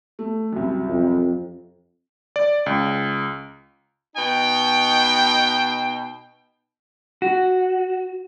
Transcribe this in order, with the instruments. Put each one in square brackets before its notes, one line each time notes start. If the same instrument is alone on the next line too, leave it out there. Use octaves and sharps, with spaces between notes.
[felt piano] A3
C2 F#2
[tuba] F2
[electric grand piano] D5
C#2
[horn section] B2 D#4 G5
[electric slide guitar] F#4